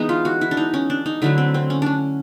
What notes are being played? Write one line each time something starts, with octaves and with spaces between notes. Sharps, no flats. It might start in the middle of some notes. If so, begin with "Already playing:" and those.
Already playing: E3 G#3 B3 D#4
F4
F#4
E4
D4
D#4
C#4
D4
D#4
D3 F#3 A3 E4
C4
C4
C#4
C#4 D4